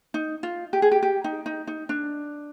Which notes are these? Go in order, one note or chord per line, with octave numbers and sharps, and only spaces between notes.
D#4
F4
G4
G#4
G4
G4
D#4
D#4
D#4
D4